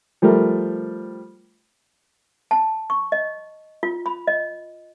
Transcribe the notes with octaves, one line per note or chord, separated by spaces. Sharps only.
F3 G3 A3 A#4
A5
C#6
D#5
F4
B5
D#5